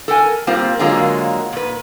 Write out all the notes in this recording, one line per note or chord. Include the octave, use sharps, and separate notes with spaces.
A4 A#4 G5 G#5
G3 A#3 C4 F4
D3 F#3 G#3 A#3 F4 A#4
A#2 B4